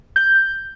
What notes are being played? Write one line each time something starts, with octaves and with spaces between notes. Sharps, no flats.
G6